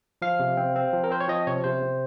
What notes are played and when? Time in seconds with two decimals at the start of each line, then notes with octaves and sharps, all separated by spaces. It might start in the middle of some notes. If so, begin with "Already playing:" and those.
0.22 F3 F5
0.40 C3
0.57 C4
0.76 C4
0.93 F3
1.04 A#4
1.10 C4 C5
1.20 C#5
1.28 F3 D#5
1.47 C3 C#5
1.64 C3 C5
1.82 C3